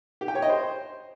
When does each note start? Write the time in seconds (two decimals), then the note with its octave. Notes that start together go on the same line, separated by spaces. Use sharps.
0.21 G4
0.28 G5
0.35 C#5
0.42 D#5
0.50 C5